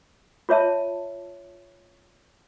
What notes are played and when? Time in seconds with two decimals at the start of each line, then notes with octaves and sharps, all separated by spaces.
0.49 F4 C#5 E5 A5